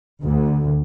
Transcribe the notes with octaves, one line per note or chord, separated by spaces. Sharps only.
D2